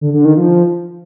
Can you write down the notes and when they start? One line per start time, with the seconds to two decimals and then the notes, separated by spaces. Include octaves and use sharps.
0.01 D3
0.14 D3
0.25 D#3
0.37 F3